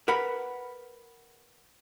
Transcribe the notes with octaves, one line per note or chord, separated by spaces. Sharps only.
A#4 B4 F#5 B5